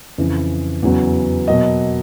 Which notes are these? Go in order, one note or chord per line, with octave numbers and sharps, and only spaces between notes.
F2 C#3 E3
E2 C#3 F#3 B3
B2 F#3 A#3 D#5